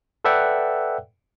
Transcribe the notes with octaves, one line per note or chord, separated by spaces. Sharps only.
A4 B4 D5 E5 F#5 G5